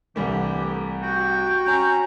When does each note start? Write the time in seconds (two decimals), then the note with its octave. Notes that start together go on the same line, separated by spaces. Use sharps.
0.16 C2 D3 E3 G3 A3 G4
1.03 F#4 G5
1.67 C#4 A#5